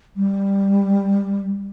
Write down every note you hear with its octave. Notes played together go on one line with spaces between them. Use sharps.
G3